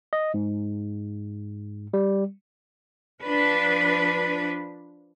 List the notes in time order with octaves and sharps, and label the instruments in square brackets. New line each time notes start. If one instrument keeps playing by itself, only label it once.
[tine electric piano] D#5
G#2
G3
[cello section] F3 D4 B4